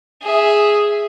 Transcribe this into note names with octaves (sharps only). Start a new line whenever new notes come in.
G#4 E5